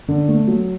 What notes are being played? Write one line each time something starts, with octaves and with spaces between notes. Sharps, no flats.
D3
A3
F#3